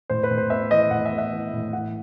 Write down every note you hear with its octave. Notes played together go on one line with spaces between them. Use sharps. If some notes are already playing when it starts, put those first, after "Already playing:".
A2 C5
B4
A2
C5
B3 E5
E3 D#5
A2 F#5
E5
B3
E5
E3
A2
E3 F#5